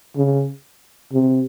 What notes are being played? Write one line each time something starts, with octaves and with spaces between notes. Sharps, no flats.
C#3
C3